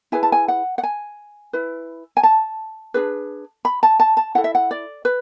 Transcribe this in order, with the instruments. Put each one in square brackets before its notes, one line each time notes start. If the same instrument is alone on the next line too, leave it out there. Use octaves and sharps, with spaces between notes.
[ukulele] E4 G#4 B4 G#5
A5
G#5
F#5
F#5
G#5
E4 B4
G#5
A5
D4 G#4 B4
B5
A5
A5
A5
E4 A4 F#5
E5
F#5
D5
B4